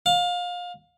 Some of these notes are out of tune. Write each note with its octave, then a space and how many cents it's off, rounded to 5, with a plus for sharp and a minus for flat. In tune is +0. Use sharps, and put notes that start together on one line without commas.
F5 +25